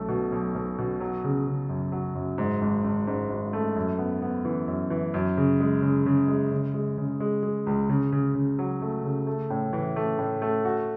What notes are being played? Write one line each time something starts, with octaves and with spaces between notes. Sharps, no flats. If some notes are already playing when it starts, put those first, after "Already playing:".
Already playing: B1 A3
B2
B1
B1
B2
F#3
C#3
C#3
F#2
F#3
F#2
G#2
G#1
G#1
G#2
G#1
A3
F#2
B3
B3
E3
F#2
E3
F#2
C#3
G#3
C#3
C#3
G#3
C#3
G#3
C#3
G#3
G#3
C#2
C#3
C#3
C#3
F#3
A3
C#3
A3
A2
E3
A3
A2
A3
F#4